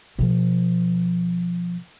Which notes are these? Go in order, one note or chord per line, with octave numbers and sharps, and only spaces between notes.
B2 F3